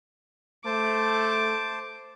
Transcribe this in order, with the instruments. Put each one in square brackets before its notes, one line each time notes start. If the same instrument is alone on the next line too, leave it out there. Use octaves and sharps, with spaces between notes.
[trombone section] A3 [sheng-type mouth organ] C5 A5 [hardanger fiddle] D6